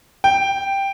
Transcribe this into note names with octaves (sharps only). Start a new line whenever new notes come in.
G5